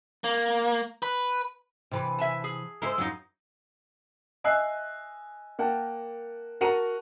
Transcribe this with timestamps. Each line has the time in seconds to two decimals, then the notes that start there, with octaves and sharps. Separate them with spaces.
0.24 A#3
1.03 B4
1.91 C3 E3 B4
2.18 E5 G#5 A5
2.44 G#4
2.82 G#3 E4 A4 A#4 C5
2.98 F#2 E3 F#3 D#4 F4
4.44 D#5 E5 G#5 E6 F#6 C7
5.59 A#3 A#4 F#5 G5 A5
6.61 F#4 A#4 F#5 A5 A#5 D#7